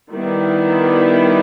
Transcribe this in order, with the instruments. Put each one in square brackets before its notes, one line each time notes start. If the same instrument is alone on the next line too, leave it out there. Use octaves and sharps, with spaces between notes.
[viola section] D#3 G3 B3 E4